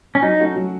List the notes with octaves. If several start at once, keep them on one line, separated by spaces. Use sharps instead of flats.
C#4
F#3 D#4
A3 C#4 F#4
F#3